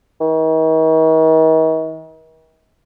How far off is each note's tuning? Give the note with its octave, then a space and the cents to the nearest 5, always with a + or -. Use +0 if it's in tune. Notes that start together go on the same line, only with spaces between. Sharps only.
D#3 +45